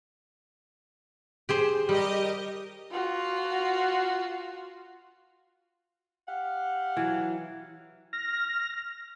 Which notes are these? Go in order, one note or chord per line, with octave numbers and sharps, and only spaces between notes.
G4 G#4 C5
G3 G4 A#4 D#5
F4 F#4
G4 F5 F#5
E3 F#3
F6 A#6